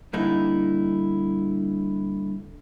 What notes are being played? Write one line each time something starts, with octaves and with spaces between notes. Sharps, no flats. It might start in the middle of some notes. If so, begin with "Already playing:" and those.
G2 A#2 D3 D#4 E4